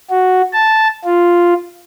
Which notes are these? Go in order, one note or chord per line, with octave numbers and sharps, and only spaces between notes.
F#4
A5
F4